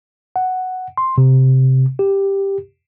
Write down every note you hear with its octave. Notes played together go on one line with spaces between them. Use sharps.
F#5
C6
C3
G4